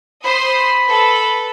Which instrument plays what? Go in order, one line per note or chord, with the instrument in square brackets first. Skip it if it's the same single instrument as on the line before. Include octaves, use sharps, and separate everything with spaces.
[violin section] C5 C6 D#6 [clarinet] B5
[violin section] A4 B4